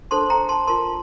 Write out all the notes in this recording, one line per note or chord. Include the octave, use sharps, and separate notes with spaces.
D4 A4 C5 A5 C6
G5 A#5
A5 C6
F4 A#4 A5 C6